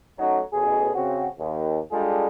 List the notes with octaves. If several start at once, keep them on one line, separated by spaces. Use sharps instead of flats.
F#3 A3 C#4 D#4 F#4
A1 B2 G#4
C#3 C4 F#4
D#2
G3 G#3 D4 F4 G#4 A4